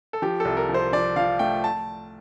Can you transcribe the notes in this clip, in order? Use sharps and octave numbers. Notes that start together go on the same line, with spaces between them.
A4
F3 G4
C2 A4
A#4
F3
C5
F3 D5
F3 F5
A3 G5
A5